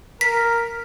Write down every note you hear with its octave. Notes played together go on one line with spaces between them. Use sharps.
A#4 B6